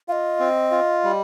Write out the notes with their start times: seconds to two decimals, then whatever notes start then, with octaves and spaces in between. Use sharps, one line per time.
0.08 F4 D#5 F5
0.40 C4
0.71 F4
1.04 G3